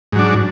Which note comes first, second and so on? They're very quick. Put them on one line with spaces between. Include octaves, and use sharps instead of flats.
G#2 F#3 D4